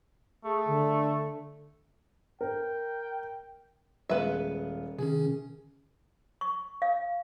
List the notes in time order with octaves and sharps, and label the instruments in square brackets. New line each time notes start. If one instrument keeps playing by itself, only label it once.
[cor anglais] A3 [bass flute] G#4
[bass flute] D3
[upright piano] A#4 [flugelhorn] G5
[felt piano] D#1 G#3 F5 [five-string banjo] B3 B4 E5
[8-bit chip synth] C3 D#3 C#4 [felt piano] G#4
[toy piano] C#6
F5